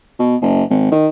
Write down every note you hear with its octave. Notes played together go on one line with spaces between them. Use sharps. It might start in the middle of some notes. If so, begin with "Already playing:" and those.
B2
F#1
G#1
D#3